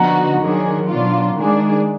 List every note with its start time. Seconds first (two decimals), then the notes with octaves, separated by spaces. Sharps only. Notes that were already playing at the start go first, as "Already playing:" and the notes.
Already playing: D3 F3 B3 D#4 F#4 F#5 A#5
0.39 D#3 F#3 D4 G#4
0.87 B2 F#3 D4 F4
1.35 D#3 G#3 D4 G#4